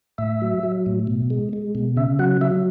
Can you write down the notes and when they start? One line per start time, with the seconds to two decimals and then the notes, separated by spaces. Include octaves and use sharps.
0.18 A2 E5
0.42 F#3
0.63 F#3
0.86 A2
1.07 B2
1.30 G#3
1.53 G#3
1.75 B2
1.97 C#3 E5
2.19 F#3 F#5
2.41 F#3 E5